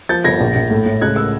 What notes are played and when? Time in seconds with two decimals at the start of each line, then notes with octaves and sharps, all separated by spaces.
0.09 F3 G6 A6
0.24 G1 G#6 A#6
0.40 A#1
0.55 A#1
0.70 A2
0.86 A2
1.01 C#2 F#6 G#6
1.16 E6 F#6